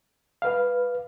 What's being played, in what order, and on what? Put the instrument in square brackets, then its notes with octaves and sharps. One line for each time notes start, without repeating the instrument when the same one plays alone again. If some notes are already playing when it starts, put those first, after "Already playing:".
[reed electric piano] B4 F5